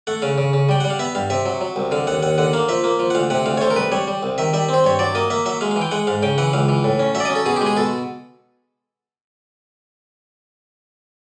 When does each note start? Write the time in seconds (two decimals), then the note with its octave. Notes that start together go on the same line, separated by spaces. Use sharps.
0.07 A3 F#5
0.22 C#3 F5
0.38 C#3
0.53 C#3
0.69 G3 G5
0.80 G3 F#5
0.90 F5
0.99 B3 E5
1.15 G2 F5
1.30 C3 E5
1.45 F#3
1.61 F#3
1.76 C2
1.91 D3 F5
2.07 D#2 F#5
2.23 D#2 F#5
2.38 D3 F#5
2.53 A#3 F5
2.68 F3 E5
2.84 A#3
2.99 F3
3.10 F#5
3.15 D2 F5
3.30 C3 F#5
3.46 D2 F5
3.57 C#5
3.61 A3 C5
3.70 A#4
3.76 C2 B4
3.92 G3 C#5
4.07 G3
4.23 C2
4.38 D#3 E5
4.53 G3 E5
4.69 C4
4.74 C5
4.84 G2 C#5
4.99 F#3 D5
5.15 A#3 D#5
5.30 A#3 E5
5.46 F#3 E5
5.61 G#3 F5
5.71 F5
5.76 E3
5.82 G5
5.91 G#3 F#5
6.07 G#2 F5
6.23 C#3 G5
6.38 E3 F#5
6.53 C#2 F5
6.69 E3
6.84 A2
6.99 C#4
7.15 F#3 E5
7.20 D5
7.25 D#5
7.30 C#4
7.35 A4
7.46 B2 G#4
7.56 G4
7.61 G#3
7.66 G#4
7.77 B2 A4